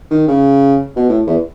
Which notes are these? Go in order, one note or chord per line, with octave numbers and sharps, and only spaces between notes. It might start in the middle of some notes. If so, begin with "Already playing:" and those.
D#3
C#3
B2
A2
E2